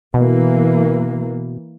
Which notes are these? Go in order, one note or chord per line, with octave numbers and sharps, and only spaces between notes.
B2 E3 A#3